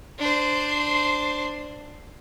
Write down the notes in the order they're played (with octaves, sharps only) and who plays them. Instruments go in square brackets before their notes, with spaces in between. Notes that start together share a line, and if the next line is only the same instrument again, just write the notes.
[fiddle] D4 C5